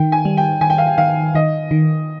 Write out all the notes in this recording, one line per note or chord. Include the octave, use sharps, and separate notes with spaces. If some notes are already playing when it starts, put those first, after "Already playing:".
Already playing: D#3 G5
G#5
G3
G5
D#3 G#5
G5
F5
G5
D#3 F5
D#3 D#5
D#3